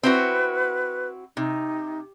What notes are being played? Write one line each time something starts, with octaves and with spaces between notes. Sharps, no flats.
C4 E4 F#4 B4
C3 D#4